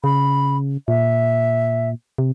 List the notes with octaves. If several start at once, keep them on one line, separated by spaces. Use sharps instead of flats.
C#3 B5
A#2 E5
C3